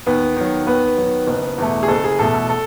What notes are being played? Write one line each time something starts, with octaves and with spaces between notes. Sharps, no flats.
D#2 B3 B4
D#3 F#3
D#2 B3 B4
D#3 F#3
F#1
E2 B2 A3
G#4
F#1 A4
G#4
E2 B2 A3 A4
A4
A4